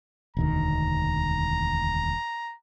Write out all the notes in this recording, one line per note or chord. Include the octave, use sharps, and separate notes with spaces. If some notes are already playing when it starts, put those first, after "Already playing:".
E1 D2 D#3 A#5